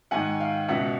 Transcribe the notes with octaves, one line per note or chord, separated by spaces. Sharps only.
G#2 D#3 F#5 G#5
F5 G5
C#2 B2 E5 F#5